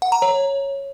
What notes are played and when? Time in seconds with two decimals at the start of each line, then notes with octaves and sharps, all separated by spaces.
0.02 F#5
0.12 A#5
0.22 C#5